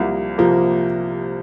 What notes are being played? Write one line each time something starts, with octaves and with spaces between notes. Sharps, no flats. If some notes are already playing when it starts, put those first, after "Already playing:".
Already playing: C2 C3 F3 A#3
C3 F3 A#3